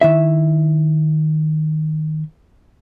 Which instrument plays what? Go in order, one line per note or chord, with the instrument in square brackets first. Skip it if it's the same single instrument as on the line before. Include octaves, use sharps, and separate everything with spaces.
[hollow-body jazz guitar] D#3 E4 E5